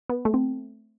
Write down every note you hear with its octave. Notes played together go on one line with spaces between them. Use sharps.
B3
A3
C4